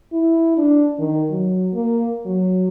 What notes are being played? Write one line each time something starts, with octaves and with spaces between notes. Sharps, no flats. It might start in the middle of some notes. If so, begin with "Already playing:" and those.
E4
D4
D#3
F#3
A#3
F#3